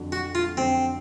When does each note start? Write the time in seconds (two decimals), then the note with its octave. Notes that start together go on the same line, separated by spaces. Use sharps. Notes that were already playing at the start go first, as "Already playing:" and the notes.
Already playing: F2 D3 F#3
0.12 F#4
0.35 F4
0.57 F2 D3 F#3 C4